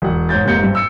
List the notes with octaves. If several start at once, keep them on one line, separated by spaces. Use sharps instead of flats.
E1 F#5
G#2 C#5 G6 A6
F1 G#2 C3 A#3 G6 C#7
G2 C4
E6 C#7